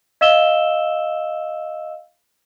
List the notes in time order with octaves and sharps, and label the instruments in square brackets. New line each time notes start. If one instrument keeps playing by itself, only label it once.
[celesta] D#5 F5 E6 E7 G7